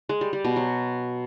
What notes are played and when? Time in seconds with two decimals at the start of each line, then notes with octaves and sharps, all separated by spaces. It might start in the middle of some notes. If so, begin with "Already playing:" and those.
0.09 G#3
0.21 G3
0.33 G3
0.44 B2
0.56 F#3